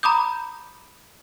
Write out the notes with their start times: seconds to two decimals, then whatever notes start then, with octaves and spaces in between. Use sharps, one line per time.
0.03 A#5 B5 D6 D#6 G6